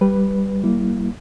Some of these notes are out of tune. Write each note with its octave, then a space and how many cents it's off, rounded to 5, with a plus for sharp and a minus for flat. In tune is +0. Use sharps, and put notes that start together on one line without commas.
G3 +0 B4 +0
G3 -35 A#3 +0 E4 +0